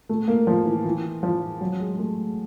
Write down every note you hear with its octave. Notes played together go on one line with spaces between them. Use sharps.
A3
A#3
F3
E3
E3
F3
F#3
G#3
G#3
A3